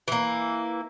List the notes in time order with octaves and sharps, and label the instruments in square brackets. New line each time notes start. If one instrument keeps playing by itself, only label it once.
[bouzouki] E3 A#3